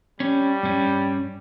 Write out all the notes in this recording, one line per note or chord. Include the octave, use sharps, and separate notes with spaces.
G3 C#4
G2 C#4